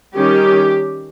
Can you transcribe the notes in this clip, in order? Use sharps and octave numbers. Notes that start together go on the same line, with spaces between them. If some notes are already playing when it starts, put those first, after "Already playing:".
D#3 G3 C#4 G4